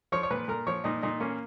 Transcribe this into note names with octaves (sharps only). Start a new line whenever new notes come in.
F3 C#5
C#5
A#2 B4
A#2 A#4
F3 C#5
A#2 D#4
A#2 D#4
A#3 C#4